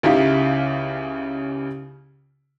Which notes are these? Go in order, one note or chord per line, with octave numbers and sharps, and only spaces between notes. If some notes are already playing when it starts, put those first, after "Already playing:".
C#2 C#3 D#4 E4 G4 F5